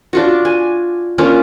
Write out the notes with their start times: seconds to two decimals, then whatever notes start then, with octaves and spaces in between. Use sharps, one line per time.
0.13 D4 F4 F#4
0.45 G#5
1.18 A#3 C#4 D4 F4